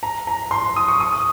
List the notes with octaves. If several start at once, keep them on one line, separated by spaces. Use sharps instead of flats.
A#5
A#5
C6
D#6
C#6
D#6
D#6